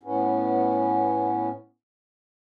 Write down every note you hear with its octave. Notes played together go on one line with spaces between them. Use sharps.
A2 B3 C#4